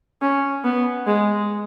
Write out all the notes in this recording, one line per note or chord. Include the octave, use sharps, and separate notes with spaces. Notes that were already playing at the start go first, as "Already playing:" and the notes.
C#4
B3
G#3